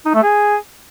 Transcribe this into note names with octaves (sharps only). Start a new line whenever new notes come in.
D#4
A3
G#4